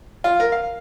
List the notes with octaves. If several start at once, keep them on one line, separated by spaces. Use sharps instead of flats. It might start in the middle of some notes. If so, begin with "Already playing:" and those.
F4
A#4
F5